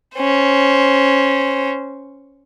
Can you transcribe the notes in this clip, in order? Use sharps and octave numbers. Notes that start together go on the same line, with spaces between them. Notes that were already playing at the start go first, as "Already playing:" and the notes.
C#4 C5